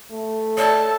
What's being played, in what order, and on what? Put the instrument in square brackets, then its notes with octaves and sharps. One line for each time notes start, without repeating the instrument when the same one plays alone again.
[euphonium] A3
[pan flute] A4 [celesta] C#5 D5 [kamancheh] A5